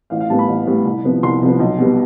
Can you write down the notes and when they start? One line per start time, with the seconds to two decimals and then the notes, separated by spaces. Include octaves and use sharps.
0.10 A1 F5
0.20 F5
0.30 A2 G3 B3 A5
0.39 B5
0.48 A1
0.67 A2 G3 B3
0.85 C2
1.04 C3 F3 B3
1.23 C2 C6
1.41 C3 F3 B3
1.60 B1
1.78 B2 G3 B3